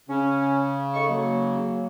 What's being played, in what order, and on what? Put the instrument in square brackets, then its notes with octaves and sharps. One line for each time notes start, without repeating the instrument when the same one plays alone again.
[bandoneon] C#3 [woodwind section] C#4
[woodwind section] D#4 A4 C#6
F#3 A#3